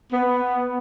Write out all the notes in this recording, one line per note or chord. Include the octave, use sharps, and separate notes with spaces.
B3